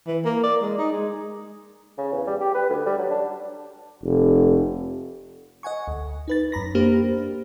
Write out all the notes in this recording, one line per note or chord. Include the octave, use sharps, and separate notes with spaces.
E3
A#3
D5
G#3
D#4
G#3
C#3
E2
G3
G4
B4
D2
G3
F#3
D4
F1
D#5 F#5 G#5 C#6
D2
D#4 B4 A6
F#2 A#5 B5 A#6
A#3 D4 G4 C5